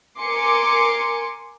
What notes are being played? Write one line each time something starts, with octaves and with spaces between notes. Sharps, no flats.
A#4 G#5 C6 D6 C#7